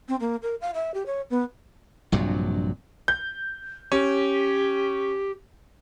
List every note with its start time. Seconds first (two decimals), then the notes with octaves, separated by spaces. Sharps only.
0.09 C4
0.20 A#3
0.42 A#4
0.61 F5
0.74 E5
0.94 G4
1.06 C#5
1.30 B3
2.12 A#1 G2 C3 F#3
3.08 G6
3.92 C#4 G4